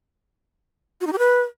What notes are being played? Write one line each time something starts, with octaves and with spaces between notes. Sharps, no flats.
F#4
D#4
G4
B4